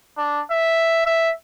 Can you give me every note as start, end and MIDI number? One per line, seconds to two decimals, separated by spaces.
0.18 0.41 62
0.51 1.03 76
1.06 1.31 76